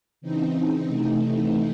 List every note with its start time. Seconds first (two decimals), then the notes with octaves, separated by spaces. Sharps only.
0.21 C#3 E3 C4 D#4
0.85 C3 E3 A3 D#4